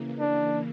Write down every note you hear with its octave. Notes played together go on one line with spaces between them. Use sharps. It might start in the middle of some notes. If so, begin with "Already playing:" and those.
Already playing: C#3 E3 A#3
D4